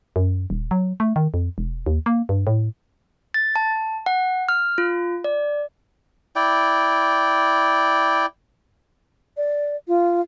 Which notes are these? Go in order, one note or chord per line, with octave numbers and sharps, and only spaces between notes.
F#2
D#1
F#3
A3
D#3
F2
E1
D#2
A#3
G2
A2
A6
A5
F#5
F6
F4
D5
E4 D5 G5
D5
F4